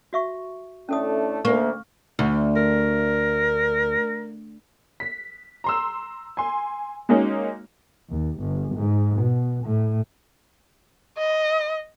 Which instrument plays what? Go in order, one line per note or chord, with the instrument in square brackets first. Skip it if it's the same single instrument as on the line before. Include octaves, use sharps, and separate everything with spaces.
[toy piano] F#4 E5 C#6
[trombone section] A2 A3 D4 [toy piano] C#4 A4 D#6
[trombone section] D2 [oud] A#3 [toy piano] C#6
[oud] D2
[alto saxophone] A#4
[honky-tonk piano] B6
A#5 C6 E6
G#5 C6
G#3 A#3 C#4 D#4 F#4
[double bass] D#2
G1
G#2
B2
A2
[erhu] D#5